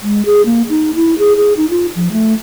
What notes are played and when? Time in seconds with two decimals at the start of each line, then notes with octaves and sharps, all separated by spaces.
0.03 G#3
0.26 G#4
0.46 A#3
0.69 D#4
0.95 E4
1.19 G#4
1.36 G#4
1.57 D#4
1.70 F4
1.95 F3
2.12 A3